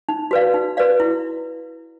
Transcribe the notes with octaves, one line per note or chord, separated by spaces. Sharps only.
D#4
F#4 B4 D5 F5
D#4
F#4 B4 D5 F5
E4